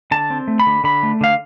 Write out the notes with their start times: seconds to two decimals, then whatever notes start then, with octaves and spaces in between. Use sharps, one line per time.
0.11 D3 A5
0.30 C4
0.48 A3
0.60 B5
0.66 D3
0.84 D3 B5
1.03 A3
1.21 D3 F5